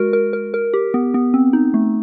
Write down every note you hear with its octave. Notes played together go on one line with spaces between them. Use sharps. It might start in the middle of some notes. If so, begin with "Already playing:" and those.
Already playing: G#3 F#4 A#4
A#4
A#4
A#4
G4
B3
B3
C4
D#4
A3